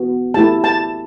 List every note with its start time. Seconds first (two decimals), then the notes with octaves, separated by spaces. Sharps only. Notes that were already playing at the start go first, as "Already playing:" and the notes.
Already playing: B3 F#4
0.34 A3 E4 G4 A5
0.64 A5